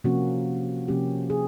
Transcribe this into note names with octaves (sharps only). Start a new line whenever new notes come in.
C3 F3 A#3 C#4 F#4
C3 F3 A#3 C#4 G4
G#4